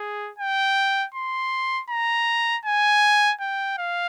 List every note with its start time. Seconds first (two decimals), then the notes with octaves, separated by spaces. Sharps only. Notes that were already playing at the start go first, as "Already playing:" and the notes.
Already playing: G#4
0.38 G5
1.14 C6
1.90 A#5
2.65 G#5
3.41 G5
3.78 F5